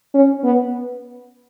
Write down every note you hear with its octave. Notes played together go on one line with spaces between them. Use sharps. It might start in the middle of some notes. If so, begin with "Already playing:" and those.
C#4
B3